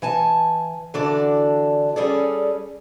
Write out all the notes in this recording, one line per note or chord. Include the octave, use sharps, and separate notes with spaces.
E3 G#5 A5
D3 E3 D4 F#4 A4 D5
G3 C#4 G#4 A4 D5